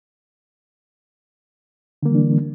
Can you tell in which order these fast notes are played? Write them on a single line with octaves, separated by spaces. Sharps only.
D3 A#3 G3 E3 D4